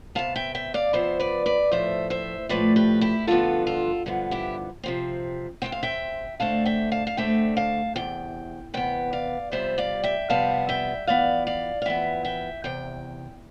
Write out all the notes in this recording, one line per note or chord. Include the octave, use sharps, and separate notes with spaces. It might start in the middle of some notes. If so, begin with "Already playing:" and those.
C3 F3 B3 F5 A5
E5 G5
E5 G5
D5 F5
C3 F3 B3 C5 E5
B4 D5
B4 D5
A2 F3 A3 C5 E5
C5 E5
A2 F3 A3 B4 D5
G4 B4
E4 G4
G2 D3 F3 B3 F4 A4
F4 A4
G2 D3 F3 B3
E4 G4
C3 F3 C4
C3 F3 C4 G5
F5
E5 G5
D2 D3 A3 C4 F5 A5
E5 G5
F5 A5
F5
D2 D3 A3 C4 E5 G5
F5 A5
E2 C3 G5
E2 C3 B3 G5
D5 F5
F2 C3 G3 B3 C5 E5
D5 F5
E5 G5
F2 C3 G3 B3 F5 A5
E5 G5
F2 E3 B3 D5 F5
D5 F5
F5
F2 E3 B3 E5 G5
E5 G5
E2 C3 G5